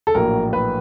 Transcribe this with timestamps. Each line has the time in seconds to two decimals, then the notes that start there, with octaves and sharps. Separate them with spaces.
0.07 A4
0.15 A#1 A2 F#3 A#3 A#4
0.53 B4